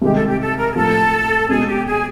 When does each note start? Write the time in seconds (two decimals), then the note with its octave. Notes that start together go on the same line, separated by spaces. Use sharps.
0.02 C2 C3 D#3 G#3 G4
0.14 A4
0.27 G4
0.39 A4
0.57 A#4
0.71 G#4
0.75 A2 F3 A3 A4
1.48 B2 G#3 C#4 G#4
1.67 G4
1.85 G#4